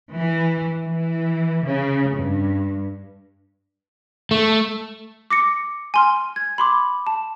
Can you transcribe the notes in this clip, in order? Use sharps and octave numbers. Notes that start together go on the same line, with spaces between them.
E3
E3
C#3
G2
A3
D6 A#6 C#7
G#5 C6 F6
G#6
B5 C6 D6
A5